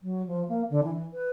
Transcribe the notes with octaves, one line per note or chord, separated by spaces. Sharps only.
F#3
F3
A#3
D3
E3
B4